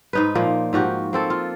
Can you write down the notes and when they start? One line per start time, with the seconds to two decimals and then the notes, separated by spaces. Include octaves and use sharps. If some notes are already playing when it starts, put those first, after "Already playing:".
0.13 G#2 D#4 B4
0.35 A#2 F3 A#3
0.73 G#2 F3 F#4 G4
1.13 A#3 C4 A4
1.30 F4